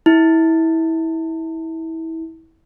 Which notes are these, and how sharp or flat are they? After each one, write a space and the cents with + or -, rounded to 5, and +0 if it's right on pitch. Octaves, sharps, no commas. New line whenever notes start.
E4 -25